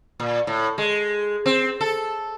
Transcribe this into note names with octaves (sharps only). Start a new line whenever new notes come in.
A#2
A2
G#3
C4
A4